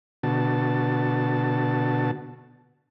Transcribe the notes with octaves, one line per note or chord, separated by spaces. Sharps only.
B2 D3 F#4 A5